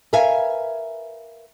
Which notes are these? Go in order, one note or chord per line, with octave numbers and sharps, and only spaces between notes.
A#4 B4 E5 F5 G#5